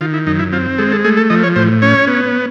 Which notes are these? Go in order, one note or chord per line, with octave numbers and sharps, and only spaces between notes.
D#3 F4
E4
F#2 D#4
E4
C4 F4
G#3 A4
A4
A3 G#4
A4
F3 D#5
C#5
A2 C5
C#4 C#5
B3